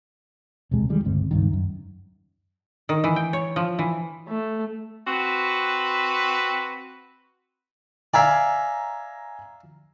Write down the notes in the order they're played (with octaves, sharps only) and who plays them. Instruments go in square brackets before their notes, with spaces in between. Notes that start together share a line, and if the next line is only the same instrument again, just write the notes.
[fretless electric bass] E1 C#2 C3 G#3
D#3 E3 G3 G#3
G1 C#2 C4
C#2 G2 D#3
F#2
[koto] D#3
E3
G5
C#5
F3
E3
[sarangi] A3
[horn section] C4 F#4 B4
[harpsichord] D5 E5 F5 [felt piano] G#5 A#5 G#6